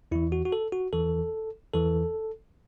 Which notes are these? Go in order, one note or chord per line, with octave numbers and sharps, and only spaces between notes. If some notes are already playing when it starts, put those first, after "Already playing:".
E2 E3 E4
F#4
F#4
A4
F#4
E2 E3 A4
E2 E3 A4